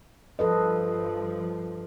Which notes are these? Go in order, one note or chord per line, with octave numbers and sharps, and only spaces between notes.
G2 F3 A4 B4 D#5